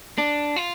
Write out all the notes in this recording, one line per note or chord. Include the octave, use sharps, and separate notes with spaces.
D4
F4